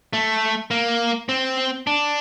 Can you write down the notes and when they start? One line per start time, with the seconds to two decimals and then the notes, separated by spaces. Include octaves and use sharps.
0.13 A3
0.71 A#3
1.29 C4
1.87 D4